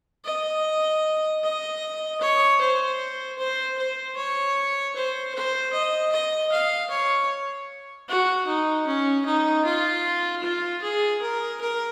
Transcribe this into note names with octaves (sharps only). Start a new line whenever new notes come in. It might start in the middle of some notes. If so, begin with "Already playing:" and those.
D#5
D#5
C#5
C5
C5
C5
C#5
C5
C5
D#5
D#5
F5
C#5
F#4
D#4
C#4
D#4
F4
F4
G#4
A#4
A#4